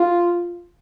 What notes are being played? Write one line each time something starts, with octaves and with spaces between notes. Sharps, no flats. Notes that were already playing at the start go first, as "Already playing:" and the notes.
Already playing: F4